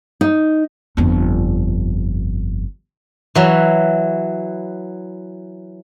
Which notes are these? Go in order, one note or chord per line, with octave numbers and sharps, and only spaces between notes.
D#4
G1 F2
E3 F#3 E5